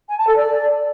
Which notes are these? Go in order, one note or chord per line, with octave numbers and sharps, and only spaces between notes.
G#5
A5
A4
D5